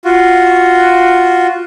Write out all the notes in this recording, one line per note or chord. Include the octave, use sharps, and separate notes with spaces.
F4 F#4